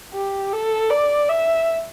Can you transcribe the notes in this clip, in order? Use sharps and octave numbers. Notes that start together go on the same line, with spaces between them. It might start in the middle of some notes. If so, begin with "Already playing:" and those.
G4
A4
D5
E5